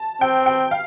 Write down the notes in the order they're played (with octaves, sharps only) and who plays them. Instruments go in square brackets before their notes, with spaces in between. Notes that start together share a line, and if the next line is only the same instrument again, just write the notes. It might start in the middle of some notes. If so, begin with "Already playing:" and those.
Already playing: [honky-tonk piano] A5
[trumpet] C4 [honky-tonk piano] G5
[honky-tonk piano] G5
F5